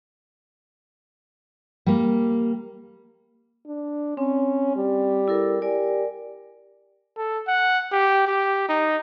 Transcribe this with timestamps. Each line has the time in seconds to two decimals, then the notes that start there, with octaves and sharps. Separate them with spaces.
1.86 G3 A#3
3.67 D4
4.17 C4 C#4
4.76 G3
5.28 E4 A4 A#4
5.62 G4 A#4 D5 G#5
7.18 A4
7.48 F#5
7.92 G4
8.28 G4
8.69 D#4